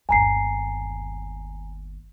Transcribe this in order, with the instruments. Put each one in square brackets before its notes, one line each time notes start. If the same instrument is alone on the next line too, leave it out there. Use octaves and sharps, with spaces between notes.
[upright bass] G1 D#2 [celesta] G#5 A#5 C7